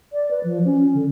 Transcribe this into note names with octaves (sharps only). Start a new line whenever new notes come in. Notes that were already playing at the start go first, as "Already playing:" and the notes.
D5
B4
F3
C#4
D3